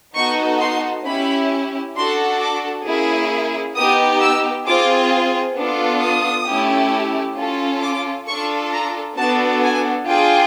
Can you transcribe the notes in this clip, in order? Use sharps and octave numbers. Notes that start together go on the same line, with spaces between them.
B3 D#4 F#4 A4 C#6
C6
C#4 E4 G4 B5
D4 F#4 A4 C6
D6
A#3 C#4 E4 G#4
B3 D#4 G4 D#6
E6
C4 F4 G#4 D6
B3 D4 F4 A4
D#6
A3 C#4 E4 G4
C#4 F4 A4
D6
D4 F4 A4 C#6
A#5
B3 D4 F#4 A4 A5
G#5
D4 F4 G#4 G5